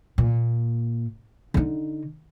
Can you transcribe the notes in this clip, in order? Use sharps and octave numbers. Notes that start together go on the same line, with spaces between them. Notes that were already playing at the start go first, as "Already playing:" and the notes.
A#2
D3 D#4